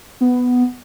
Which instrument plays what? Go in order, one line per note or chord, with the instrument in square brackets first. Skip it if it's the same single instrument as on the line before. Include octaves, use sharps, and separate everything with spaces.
[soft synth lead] B3